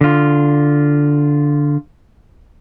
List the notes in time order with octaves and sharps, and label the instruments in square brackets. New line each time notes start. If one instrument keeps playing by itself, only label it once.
[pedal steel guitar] D3 F4